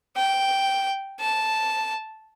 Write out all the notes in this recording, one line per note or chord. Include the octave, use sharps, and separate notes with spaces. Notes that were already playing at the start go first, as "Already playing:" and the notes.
G5
A5